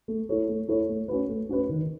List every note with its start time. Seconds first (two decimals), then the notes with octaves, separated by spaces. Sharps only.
0.08 A3
0.29 E4 A4 C#5
0.49 A3
0.68 E4 A4 C#5
0.89 A3
1.08 C#4 F#4 B4
1.29 A3
1.49 C#4 F#4 B4
1.69 D#3